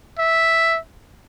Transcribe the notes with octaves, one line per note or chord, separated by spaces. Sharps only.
E5